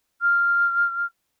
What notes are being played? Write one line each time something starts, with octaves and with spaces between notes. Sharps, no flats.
F6